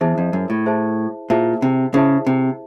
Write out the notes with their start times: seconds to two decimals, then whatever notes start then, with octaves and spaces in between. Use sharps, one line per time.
0.01 E2 E4 G#4 C5 E5 A5
0.18 F2
0.33 F#2
0.50 A2
0.66 E4 G#4 C5 E5 A5
1.30 A#2 E4 G#4 C5 E5 A5
1.62 C3
1.94 C#3 E4 G#4 C5 E5 A5
2.27 C3